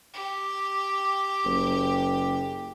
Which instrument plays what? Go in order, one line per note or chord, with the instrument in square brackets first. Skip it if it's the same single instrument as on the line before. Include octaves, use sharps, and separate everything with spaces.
[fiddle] G4
[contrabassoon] F#1